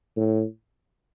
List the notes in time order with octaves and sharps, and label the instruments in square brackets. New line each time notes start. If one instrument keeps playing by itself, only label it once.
[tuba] A2